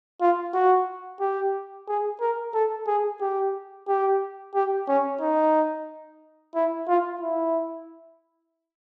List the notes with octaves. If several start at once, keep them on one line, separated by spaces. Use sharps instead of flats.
F4
F#4
G4
G#4
A#4
A4
G#4
G4
G4
G4
C#4
D#4
E4
F4
E4